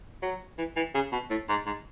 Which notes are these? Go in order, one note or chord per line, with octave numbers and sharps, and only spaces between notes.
F#3
E3
E3
C#3
B2
A2
G#2
G#2